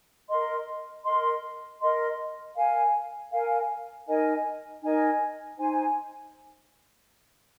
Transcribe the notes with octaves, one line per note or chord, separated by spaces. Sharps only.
A#4 D#5 C6
A#4 D#5 C6
A#4 D#5 C6
A#4 F5 G#5
A#4 F5 G#5
D#4 A#4 D#5 G#5
D#4 A#4 D#5 G#5
D#4 C5 G#5